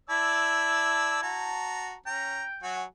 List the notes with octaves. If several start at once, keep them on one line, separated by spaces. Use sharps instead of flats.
E4 D5 A5 E6
F#4 A5 A#5
C#4 G5 A#5
F#3 F#4 G#5